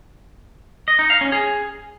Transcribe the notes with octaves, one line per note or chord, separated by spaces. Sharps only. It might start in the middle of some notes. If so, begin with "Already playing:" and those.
D#5
D#4
F5
C#4
G#4